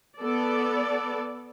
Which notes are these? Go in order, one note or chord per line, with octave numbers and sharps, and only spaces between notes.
B3 A4 D5